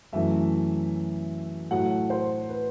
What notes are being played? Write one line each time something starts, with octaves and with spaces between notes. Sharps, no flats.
F#2 E3 A3 E5
A2 F#3 A3 F#5
C5
B4